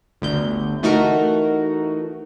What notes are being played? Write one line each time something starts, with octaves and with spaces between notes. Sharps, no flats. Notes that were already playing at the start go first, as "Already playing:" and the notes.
G1 D2 G6
E3 A3 D#4 F#4 A#4